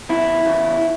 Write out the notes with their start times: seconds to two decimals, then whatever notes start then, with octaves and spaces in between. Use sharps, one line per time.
0.09 E2 C#3 E3 E4
0.46 E2 C#3 E3